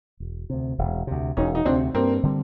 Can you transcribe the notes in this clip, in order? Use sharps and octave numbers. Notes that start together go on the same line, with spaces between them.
E1
D2 C3
E1
D2 C3
E1 C#4 D#4
D#4
D2 C3 C4 D4
G2 A#3 C4
D3 G3 C4